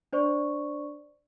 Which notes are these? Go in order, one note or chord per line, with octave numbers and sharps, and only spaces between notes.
D4 C5 D5 C#6